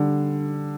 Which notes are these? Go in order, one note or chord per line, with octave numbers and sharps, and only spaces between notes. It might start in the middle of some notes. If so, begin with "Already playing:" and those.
Already playing: D3 G3